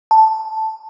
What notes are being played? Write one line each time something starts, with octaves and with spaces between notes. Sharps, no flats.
A5